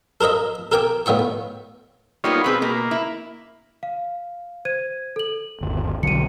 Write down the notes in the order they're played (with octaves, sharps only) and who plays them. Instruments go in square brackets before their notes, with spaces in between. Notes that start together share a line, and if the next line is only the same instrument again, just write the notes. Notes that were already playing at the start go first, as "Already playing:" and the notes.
[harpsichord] A4 A#4 C5 D#5 E5
A4 A#4 G5 G#5 D6
A2 B3 E5 G5 C#6
[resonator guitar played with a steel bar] G3 A#3 B3 [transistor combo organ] D#4 F4 C#5
[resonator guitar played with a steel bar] B2 C4 G#4 [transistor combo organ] B4
[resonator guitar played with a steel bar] B2 [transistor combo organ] A#3
[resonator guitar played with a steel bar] E4
[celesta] F5
C5 G#6 D#7
A4 F#7
[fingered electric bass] G1 D#2
[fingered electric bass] B1 D3 F#3 [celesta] C#7 D#7